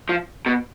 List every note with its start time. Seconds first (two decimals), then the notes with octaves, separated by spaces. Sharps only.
0.09 F3
0.46 B2